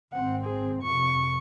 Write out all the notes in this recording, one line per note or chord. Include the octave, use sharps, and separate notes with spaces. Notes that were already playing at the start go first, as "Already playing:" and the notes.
G#1 C4 F#5
G#4
F2 C3 C#6